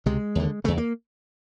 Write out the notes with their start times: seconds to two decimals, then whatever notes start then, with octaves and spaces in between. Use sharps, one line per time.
0.06 C#2 C3 G#3
0.35 D#2 D3
0.64 E2 C#3 A3
0.78 A#3